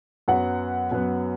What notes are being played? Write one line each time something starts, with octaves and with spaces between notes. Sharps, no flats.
F#2 F#3 B3 F#5
F#2 F#3 B3